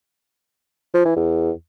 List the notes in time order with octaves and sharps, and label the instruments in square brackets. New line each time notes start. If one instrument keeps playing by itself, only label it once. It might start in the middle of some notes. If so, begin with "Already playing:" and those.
[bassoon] F3
E3
E2